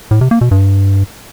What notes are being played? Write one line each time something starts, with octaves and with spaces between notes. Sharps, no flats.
A2
C3
A#3
B2
G2